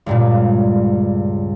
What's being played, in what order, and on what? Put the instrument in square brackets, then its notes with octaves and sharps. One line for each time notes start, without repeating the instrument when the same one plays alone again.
[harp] C#2 G2 A#2